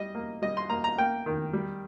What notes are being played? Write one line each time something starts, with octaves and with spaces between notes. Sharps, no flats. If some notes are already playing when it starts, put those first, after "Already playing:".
Already playing: G3 D#5
A#3
G3 D#5
C6
A#3 A#5
A#5
A#3 G5
D#3
G3